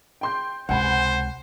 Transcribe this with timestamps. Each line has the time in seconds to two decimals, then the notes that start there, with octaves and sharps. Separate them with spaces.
0.21 G5 C6 G6
0.69 C#2 C3 C5 F#5 G#5 B5